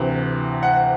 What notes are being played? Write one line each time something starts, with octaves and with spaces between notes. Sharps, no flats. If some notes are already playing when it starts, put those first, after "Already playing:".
Already playing: D2 C3 E3
F#5